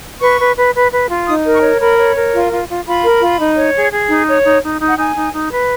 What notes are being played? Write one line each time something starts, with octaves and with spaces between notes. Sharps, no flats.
B4 C#6
B4
B4
B4
B4
F4
D#4 D#6
A#4
C#6
C#5
A#4 B5
C#5
A#4
F4
F4
F4
F4 B5
A#4
F4
D#4
C#5
G#4
G#4
D#4
C#5
D#4
D#4
D#4
F#5
D#4 G#5
D#4
D#4
B4